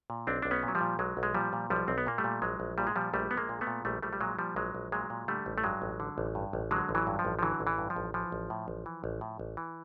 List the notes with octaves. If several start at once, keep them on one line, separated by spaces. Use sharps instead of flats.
A#2
B1 C4 D4
B1 D4
B3 C#4
A#2
F#3
F3 G3
A#2
B1 F#3 G#3
B1
G#3
A#2 F3 G3
A#2
B1 F3 G3
B1 C4
B3
A#2 A#3
G3 A3
A#2
A#1 F#3 G#3
A#1
A#2 G3
G#3
A#2 F3 G3
A#1 G3 A3
A#1 B3
G#3 A#3
A#2
A3 B3
A#2
A#1 G3 A3
A#1 G3 A3
G3
A#2 F#3 G#3
A#2 F3 G3
A#1 F#3 G#3
A#1
A#2 F#3 G#3
A#2
D3 G3 A3
A1
A3
G2 F#3 G#3
A1
D3
A1
G2
A1
D3 F#3 G#3
A1
E3 F#3
G2
F3
A1
F3
D3 E3 F#3
A1
E3
G2
F3
A1
E3 F3
A1
A2
A1
E3
A1
A2
A1
E3